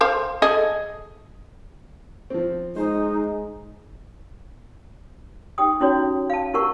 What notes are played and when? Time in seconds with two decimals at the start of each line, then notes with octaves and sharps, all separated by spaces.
0.01 C5 F5 G5
0.42 G#4 A4 D#5
2.30 F3 C4
2.76 G#3 D#4 C5
5.58 D#4 G4 G5 D#6
5.80 C#4 E4 F#4 C#5
6.30 F5 A5
6.54 E4 G4 A#4 F#5 C#6